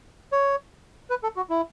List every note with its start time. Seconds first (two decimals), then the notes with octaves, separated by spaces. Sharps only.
0.32 C#5
1.10 B4
1.23 A4
1.37 F#4
1.50 E4